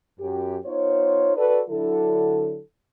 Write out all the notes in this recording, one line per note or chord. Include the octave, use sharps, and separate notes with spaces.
F#2 G4
B3 D#4 F4 C5 C#5
F#4 A4 B4 D5
D3 F#3 E4 A4